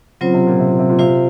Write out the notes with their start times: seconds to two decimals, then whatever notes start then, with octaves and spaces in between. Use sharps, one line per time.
0.21 C#3 F#3 C4 F4 C5
0.34 C3
0.47 A#2
0.60 C3
0.70 A#2
0.79 C3
0.89 A#2
0.99 C3 F4 C5 F5